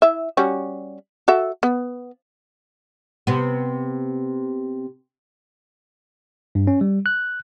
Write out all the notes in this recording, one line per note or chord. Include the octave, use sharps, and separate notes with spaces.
E4 E5
G3 C#4 F#4
F#4 A4 E5
B3
C3 B3
G2
C#4
G3
F#6